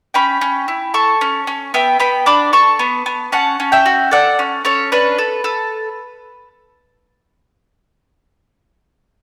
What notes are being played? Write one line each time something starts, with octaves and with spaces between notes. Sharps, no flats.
C#4 G5 B5
C#4
E4
A4 A5 C#6
C#4
C#4
B3 E5 G5
B3 G5 B5
D4 B5 D6
A4 A5 C#6
B3
B3
C#4 F#5 A5
C#4
E5 G5
F#4
A4 D5 F#5
C#4
C#4 A4 C#5
D4 B4
A4
A4